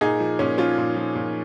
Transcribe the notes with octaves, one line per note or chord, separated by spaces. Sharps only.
A#2 D#4 G#4
F3
A#2 C#4
F3 C#4 F4
A#2
F3
A#2